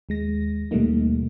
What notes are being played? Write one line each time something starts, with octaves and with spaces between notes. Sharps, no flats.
D#2 G#3 A#6
D#2 B2 G3 A3 A#3 D#4